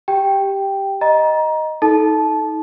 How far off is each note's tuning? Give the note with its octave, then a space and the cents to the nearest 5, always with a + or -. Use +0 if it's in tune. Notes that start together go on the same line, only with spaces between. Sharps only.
G4 +0 G5 +0
D#5 +0 A#5 +20
D#4 +35 A4 -25 A5 -20